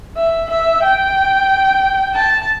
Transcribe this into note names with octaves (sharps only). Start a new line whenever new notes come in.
E5
E5
G5
A5